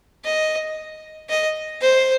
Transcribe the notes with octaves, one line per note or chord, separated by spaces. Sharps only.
D#5
D#5
C5